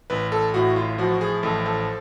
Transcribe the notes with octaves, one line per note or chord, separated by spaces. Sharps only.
A1 B4
A4
A2 F#4
F4
F3 F#4
G#4
A1 A4
A4